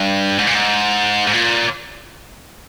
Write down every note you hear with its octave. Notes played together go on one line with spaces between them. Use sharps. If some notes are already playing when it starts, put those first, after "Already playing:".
Already playing: G2
G#2
A#2
G#2
G#2
A#2